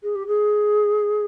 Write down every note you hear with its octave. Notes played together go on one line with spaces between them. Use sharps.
G#4
G4
G#4